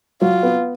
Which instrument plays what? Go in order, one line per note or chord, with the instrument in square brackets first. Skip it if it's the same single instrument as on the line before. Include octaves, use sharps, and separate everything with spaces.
[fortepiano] F#3 [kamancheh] F4
[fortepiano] B3